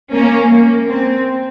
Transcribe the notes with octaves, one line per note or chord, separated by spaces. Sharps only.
A#3 C#4
A#3
C4